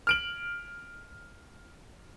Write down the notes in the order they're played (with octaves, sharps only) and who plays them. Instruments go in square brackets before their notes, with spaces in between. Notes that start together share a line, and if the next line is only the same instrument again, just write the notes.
[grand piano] F6 D7 F#7